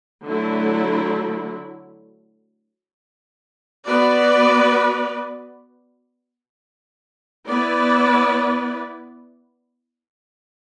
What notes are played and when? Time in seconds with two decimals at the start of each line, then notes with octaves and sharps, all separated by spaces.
0.24 D3 F#3 A3 E4
3.86 B3 F#4 B4 D5
7.48 B3 E4 B4 D5